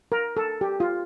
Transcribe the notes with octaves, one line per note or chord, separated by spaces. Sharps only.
A#4
A4
G4
F4